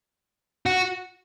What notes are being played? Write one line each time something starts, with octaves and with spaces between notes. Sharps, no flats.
F#4